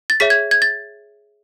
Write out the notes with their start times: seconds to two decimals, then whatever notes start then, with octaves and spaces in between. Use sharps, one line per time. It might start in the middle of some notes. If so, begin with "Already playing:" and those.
0.10 A6
0.20 G#4 C#5 E5 B6
0.30 G#6
0.51 G#6
0.62 A6